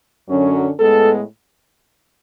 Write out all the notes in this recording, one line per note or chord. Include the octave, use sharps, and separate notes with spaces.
F#2 D3 F#3 C#4
A2 G#3 B3 A4